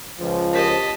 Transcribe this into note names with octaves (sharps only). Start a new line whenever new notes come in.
C#2 F3
G4 A#4 C5 D#5 A5 B6